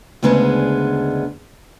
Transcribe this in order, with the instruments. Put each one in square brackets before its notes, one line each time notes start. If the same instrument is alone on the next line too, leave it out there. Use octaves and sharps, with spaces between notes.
[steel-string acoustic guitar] D2 C#3 G#3 B3 D4